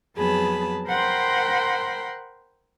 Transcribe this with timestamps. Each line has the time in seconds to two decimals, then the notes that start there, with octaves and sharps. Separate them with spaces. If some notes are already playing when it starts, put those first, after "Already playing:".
0.16 F2 F#3 B3 G#4 A5 B5
0.88 A#4 C5 F#5 G5 B5 C6